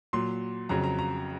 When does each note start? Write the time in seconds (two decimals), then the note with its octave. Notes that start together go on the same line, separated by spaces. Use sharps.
0.13 A#2 F#3 C6
0.69 F2 C#3 F#3 A#5
0.84 A#5
0.99 A#5